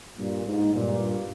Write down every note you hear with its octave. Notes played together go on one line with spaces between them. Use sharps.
G2 A#2
G#2
G2 A#2